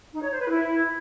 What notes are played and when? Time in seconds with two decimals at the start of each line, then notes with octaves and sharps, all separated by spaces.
0.13 D#4
0.22 C#5
0.31 C5
0.40 B4
0.49 E4